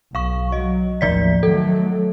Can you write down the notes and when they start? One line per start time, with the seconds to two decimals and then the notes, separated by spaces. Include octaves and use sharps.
0.15 B1 F5 C#6
0.52 F#3 D#5
1.01 A1 D#2 F3 D5 B6
1.43 D#3 F#3 A3 A4